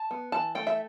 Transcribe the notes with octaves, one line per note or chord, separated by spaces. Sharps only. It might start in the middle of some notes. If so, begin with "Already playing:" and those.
Already playing: A5
B3
E3 A5
A3 G5
E5